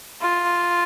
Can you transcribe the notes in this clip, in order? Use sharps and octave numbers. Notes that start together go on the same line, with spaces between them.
F4